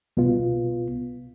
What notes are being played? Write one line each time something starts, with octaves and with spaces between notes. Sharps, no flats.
C2 B2 B3 F4